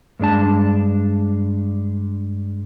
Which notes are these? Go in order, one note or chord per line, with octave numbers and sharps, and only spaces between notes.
G2 G#3 D4 A5